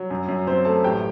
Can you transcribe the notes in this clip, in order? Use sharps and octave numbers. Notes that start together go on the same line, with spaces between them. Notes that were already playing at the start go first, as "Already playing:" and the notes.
Already playing: F#3
F#2
F#2
F#3 C4 C5
A3 A4 A5
A1 G4 G5